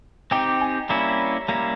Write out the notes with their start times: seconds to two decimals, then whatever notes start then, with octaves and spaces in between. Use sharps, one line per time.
0.31 C4 D#4 G4 G5
0.61 G#5
0.89 G3 A#3 C#4 E4
1.48 G3 A#3 C#4 E4 A#5